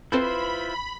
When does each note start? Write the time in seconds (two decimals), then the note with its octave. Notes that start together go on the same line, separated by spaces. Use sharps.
0.12 C4 E4 F4 A4 B4 C5 B5 G6